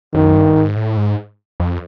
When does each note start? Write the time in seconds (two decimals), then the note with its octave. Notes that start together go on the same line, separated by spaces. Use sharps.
0.15 F#2 D#3
0.35 G2
0.55 G#2
0.76 A2
0.97 G#2
1.60 F2